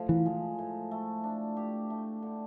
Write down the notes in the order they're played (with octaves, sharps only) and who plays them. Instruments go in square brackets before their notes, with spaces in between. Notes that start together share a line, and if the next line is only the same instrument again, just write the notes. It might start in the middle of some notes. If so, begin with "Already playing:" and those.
Already playing: [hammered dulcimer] A2 F3
[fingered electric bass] E3
[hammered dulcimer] G#3
A2
A3
D4
G4
A3
D3